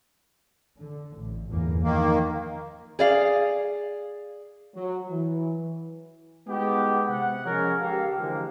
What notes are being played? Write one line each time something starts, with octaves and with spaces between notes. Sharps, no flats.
D3
A1
G1 E2 A#3
D#3 F3 A#3
G#4 D5 F5
F#3
E3
G#3 B3 D#4 F#4 G4
C3 F#5
F3 G#3 C#4 G#4 A#4 C#5
C#2 F3 G4 A4 A#4 F5
D3 E3 F3 G#3 A#3